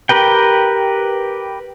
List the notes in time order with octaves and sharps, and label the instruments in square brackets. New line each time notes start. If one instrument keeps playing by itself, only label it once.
[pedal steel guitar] G4 A#4 B4 G5